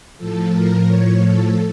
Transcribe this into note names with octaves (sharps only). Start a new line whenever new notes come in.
A2 F3 A4
A#4
C#5
A4